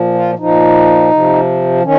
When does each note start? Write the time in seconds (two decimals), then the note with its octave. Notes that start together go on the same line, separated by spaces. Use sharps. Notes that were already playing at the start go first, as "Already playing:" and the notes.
Already playing: A#2 F3
0.14 F4
0.39 A#2 F3 D#4
1.11 C3 F3
1.83 D#3 C#4